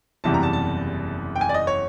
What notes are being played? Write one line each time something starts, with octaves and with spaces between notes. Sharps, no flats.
F#1 E2 C3 E3 G3 A5
A#5
A5
A5
G5
G#5
D5
D#5
C#5